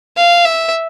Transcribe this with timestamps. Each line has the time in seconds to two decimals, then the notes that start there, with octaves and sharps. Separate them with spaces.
0.17 F5
0.45 E5